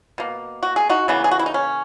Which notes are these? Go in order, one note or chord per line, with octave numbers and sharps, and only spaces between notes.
B2 A#3
F#4
G#4
D#4 F#4
C#3 E3 A#3 B3
G#4
F#4
E4
D#4
C#4